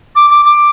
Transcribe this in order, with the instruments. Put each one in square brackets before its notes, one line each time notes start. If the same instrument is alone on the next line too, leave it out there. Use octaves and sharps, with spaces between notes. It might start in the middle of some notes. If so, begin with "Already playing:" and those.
[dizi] D6
D6
D6